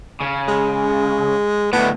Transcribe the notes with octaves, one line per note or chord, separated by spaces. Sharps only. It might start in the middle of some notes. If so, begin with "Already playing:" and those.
C#3
G#3
D2 A2 B3